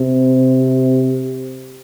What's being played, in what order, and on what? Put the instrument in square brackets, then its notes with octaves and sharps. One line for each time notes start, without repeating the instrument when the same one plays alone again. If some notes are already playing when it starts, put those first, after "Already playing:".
Already playing: [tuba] C3